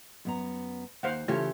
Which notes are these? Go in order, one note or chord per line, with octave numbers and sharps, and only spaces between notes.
F#2 B3 A#5
D#2 C5 F5 F#5
C#3 E3 A3 F4 G4 C#5